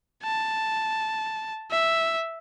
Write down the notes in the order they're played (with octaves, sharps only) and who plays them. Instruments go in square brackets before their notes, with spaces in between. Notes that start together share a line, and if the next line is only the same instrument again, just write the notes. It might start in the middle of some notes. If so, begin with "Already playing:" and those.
[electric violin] A5
E5